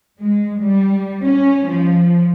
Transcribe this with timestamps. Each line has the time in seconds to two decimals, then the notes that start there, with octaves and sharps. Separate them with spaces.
0.19 G#3
0.61 G3
1.21 C#4
1.66 F3